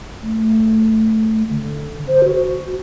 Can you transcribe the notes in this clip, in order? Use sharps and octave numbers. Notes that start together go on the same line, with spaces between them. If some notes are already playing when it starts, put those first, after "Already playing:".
A3
D3
C5
F#4